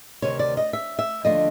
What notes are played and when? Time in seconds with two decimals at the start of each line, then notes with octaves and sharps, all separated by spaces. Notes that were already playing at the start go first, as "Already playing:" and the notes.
0.22 D2 C3 D#3 C#5
0.39 D5
0.57 D#5
0.73 E5
0.99 E5
1.24 D#2 D3 F3 A3 D4 D#5